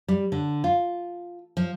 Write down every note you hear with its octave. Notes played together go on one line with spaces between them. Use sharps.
G3
D3
F4
F3